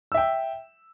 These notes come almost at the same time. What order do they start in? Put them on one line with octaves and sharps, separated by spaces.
E6 E5 G5